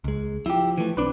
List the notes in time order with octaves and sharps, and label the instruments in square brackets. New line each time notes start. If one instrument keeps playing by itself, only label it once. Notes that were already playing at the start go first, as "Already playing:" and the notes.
[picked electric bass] C#2 G#3
[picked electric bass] F3 [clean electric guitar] E4 G4
[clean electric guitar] E3 A3
[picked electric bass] B1 C4 D4 [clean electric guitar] B4 D5